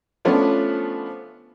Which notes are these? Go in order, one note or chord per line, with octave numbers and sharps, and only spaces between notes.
F3 A3 B3 C#4 D4 F4